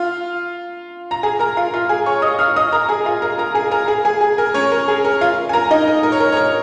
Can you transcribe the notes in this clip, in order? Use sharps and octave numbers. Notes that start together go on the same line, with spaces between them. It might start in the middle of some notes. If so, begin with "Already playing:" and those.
Already playing: F4 F5
A#5
G#4 G#5
A#4 A#5
F4 F5
F4 F5
G#4 G#5
C#5 C#6
D#5 D#6
F5 F6
D#5 D#6
A#4 A#5
G#4 G#5
F4 F5
A#4 A#5
A#4 A#5
G#4 G#5
A#4 A#5
G#4 G#5
G#4 G#5
G#4
A#4
C#4 C#5
A#4
G#4
A#4
F4 F5
G#5
A#4 A#5
D#4 D#5
A#4
A#4
C#5
A#4
C#5
A#4